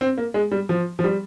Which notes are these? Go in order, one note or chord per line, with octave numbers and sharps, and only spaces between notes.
C4
A#3
G#3
G3
F3
F3
G3